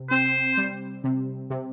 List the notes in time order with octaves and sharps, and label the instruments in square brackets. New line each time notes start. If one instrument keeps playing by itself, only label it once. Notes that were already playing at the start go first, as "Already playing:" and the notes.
Already playing: [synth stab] C3
[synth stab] C4 [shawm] C5
[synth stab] G3
C3
C3